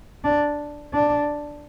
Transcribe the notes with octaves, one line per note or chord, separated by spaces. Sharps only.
D4
D4